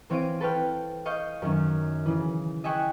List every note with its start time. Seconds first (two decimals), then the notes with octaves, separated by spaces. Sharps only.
0.10 E3 C4 C#5 F5 D7 D#7
0.41 A4 B4 C#5 G5 F6
1.05 D#5 F5 C#6 F6 G6
1.42 F#2 D#3 C#4
2.06 C#3 E3
2.64 D#5 E5 G5 G#5 C#6 F#6